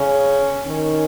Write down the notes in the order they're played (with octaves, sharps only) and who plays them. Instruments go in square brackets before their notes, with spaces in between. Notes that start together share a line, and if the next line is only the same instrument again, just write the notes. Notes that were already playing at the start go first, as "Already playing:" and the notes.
Already playing: [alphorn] C#3 [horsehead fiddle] C#4
[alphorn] D#3 [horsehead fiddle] C#4